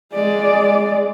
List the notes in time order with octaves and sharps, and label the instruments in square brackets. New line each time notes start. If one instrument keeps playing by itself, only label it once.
[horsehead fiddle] G#3 D5